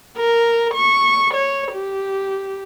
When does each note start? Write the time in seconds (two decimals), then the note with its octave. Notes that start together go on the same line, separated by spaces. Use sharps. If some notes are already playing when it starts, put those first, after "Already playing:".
0.17 A#4
0.74 C#6
1.34 C#5
1.72 G4